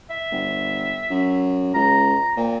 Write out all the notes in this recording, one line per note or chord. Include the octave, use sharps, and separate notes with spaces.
E5
G1
F#2
C#2 A#5
A#2 C4